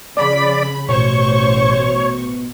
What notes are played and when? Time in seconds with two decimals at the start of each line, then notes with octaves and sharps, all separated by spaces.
0.17 C#3 F3 D5 B5
0.89 A1 B2 C5 C#5 C#6